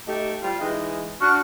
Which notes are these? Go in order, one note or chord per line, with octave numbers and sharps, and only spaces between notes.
A3 D#4 G4
G3 F4
E3 G#3 D#4
D4 F#4 C#6 F6 F#6